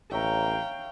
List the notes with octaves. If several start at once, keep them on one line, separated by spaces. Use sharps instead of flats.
A1 A#4 C#5 E5 F5 G5